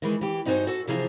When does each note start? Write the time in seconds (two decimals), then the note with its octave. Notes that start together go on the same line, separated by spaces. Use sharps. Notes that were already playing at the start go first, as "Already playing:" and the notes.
0.02 D#3 E3 G#3
0.21 E3 G4
0.45 G2 D#4 F#4 G4 C5 G#5
0.67 F#4 A4
0.87 C3 E3 F3 G#4 A#5